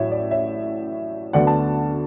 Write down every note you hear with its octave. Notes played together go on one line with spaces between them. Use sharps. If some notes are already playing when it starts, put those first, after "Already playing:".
Already playing: A1 A2 F#3 C#5 E5
D5
C#5 E5
D2 D3 F#3 B3 D5 F#5
A5